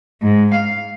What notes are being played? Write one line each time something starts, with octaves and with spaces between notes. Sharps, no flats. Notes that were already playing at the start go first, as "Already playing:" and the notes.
G#2
F5